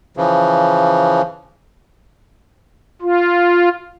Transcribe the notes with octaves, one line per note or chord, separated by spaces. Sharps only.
C#3 E3 F3
F4